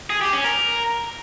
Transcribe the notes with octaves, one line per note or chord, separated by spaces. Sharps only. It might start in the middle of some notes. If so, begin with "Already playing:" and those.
G#4
G4
C#4
A#4